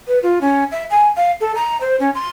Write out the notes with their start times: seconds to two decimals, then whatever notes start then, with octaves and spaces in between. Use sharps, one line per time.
0.08 B4
0.23 F4
0.41 C#4
0.72 E5
0.90 G#5
1.17 F5
1.41 A4
1.55 A#5
1.81 C5
2.00 C#4
2.15 C6